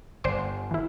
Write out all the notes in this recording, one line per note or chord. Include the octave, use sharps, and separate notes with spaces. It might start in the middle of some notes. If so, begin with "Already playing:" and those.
G1 C5 D5 C6
E3 E4